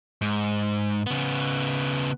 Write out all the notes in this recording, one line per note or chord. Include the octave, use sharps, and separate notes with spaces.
G#2
C#3 B3